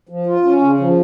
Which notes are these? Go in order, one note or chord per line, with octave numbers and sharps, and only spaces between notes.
F3
F4
C#4
C#3
F3